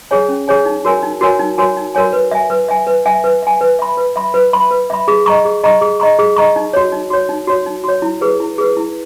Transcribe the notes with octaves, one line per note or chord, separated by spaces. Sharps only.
G#4 C#5 G#5
C#4
G#4 C#5 G#5
D#4
F#4 A#4 C#5 G#5
D#4
F#4 A#4 C#5 G#5
D#4
F#4 A#4 C#5 G#5
D#4
F#4 A#4 C#5 G#5
B4
E5 G#5
B4
E5 G#5
B4
E5 G#5
B4
E5 G#5
B4
E5 B5
B4
E5 B5
B4
E5 B5
B4
E5 B5
G#4
D#5 A#5 C#6
G#4
D#5 A#5 C#6
G#4
D#5 A#5 C#6
G#4
D#5 A#5 C#6
D#4
F#4 C#5
D#4
F#4 C#5
D#4
F#4 C#5
D#4
F#4 C#5
E4
G#4 B4
E4
G#4 B4
E4